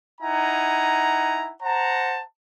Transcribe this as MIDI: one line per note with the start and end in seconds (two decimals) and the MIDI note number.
0.21 1.52 63
0.21 1.52 64
0.21 1.52 78
0.21 1.52 80
0.21 1.52 82
1.63 2.21 72
1.63 2.21 78
1.63 2.21 81
1.63 2.21 82